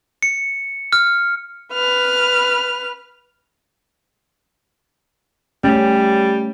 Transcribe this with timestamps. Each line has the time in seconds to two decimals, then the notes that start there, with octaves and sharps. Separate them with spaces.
0.23 C#7
0.93 F6
1.73 B4 F6
5.64 G3 A3 C#4